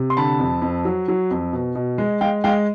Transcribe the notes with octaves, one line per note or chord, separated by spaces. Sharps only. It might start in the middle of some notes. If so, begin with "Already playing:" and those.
Already playing: C3
C6
D3 A5 B5
F2
F2
F#3
F#3
F2
B2
B2
G#3
G#3 F5 G5
G#3 F5 G5